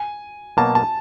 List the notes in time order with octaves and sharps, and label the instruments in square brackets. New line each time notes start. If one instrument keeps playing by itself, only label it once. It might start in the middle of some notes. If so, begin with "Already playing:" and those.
Already playing: [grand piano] G#5
[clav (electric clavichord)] B2 F#3 A#3 [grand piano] A5
[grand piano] A5